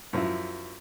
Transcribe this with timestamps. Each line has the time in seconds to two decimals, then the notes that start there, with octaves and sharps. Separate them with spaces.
0.13 F#2 F3 E4